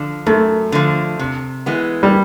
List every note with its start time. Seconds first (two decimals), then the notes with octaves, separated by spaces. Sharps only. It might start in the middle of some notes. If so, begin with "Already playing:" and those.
Already playing: D3 F3
0.26 F#2 A3
0.72 D3 F3
1.19 C3
1.66 E3 G#3 B3
2.03 G3